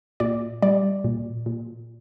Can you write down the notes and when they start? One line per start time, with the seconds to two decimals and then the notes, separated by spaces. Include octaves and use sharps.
0.20 A#2 D5
0.62 G3 D5
1.04 A#2
1.46 A#2